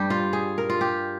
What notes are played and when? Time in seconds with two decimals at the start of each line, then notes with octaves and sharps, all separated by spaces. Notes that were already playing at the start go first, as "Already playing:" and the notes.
Already playing: G2 G3 G4
0.10 F4
0.33 G#4
0.58 A#4
0.70 F4
0.81 G4